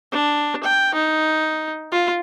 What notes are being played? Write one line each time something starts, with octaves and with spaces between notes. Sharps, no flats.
D4
G5
D#4
F4